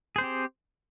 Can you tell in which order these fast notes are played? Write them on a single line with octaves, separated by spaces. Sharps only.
G#4 C5 C4 G4